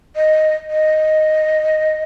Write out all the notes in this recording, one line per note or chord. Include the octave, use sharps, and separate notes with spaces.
D#5
D#5